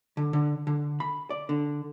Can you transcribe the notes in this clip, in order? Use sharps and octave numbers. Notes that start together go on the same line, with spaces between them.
D3
D3
D3
B5
D5
D3